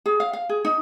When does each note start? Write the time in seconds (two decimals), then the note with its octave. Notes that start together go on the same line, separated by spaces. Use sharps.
0.06 G#4
0.20 F5
0.33 F5
0.49 G#4
0.65 D#4